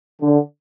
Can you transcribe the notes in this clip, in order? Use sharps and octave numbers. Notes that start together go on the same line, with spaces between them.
D3